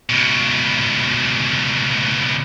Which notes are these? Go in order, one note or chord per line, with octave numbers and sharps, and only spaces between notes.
C#2 B2